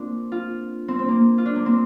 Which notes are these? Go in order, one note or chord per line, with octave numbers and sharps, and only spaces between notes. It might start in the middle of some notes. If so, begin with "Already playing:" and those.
Already playing: A#3 C4 D4 F4
F4
C4
C4
A#3
F4
D4
A#3
C4